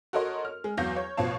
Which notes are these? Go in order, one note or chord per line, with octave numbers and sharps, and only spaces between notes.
F#4 A4 A#4 C#5 D#5 C6
F6
G#3
E2 F#3 F5 G6 A#6
C#5
A1 B2 F3 C#5 F5 A5